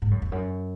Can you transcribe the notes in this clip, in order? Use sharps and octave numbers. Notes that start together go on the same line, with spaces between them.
G#2
F#2
F2
F#2